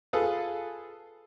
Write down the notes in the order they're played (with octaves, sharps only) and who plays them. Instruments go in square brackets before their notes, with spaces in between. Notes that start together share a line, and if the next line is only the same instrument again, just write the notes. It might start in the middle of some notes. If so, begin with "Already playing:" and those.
[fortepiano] F4 G#4 A4 B4 D#6